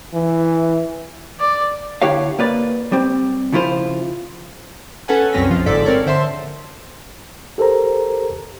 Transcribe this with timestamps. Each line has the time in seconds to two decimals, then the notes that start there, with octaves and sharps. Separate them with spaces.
0.13 E3
1.40 D5
2.02 D3 E4 G4 C#5 F5
2.39 A#3 B4 D5
2.92 G3 C4
3.53 C#3 F3 E4 F4 C5
5.08 C#4 A4 B4 F#5 G#5
5.33 C2 F#2 C4 C#4 A#6 B6
5.49 A#1 F3 F4
5.66 G1 G#2 A4 D5 B6
5.85 C4 A#4 C#5 D5
6.06 D3 C5 E5 A5 C6 E7
7.58 G4 A4 A#4 C5 A#5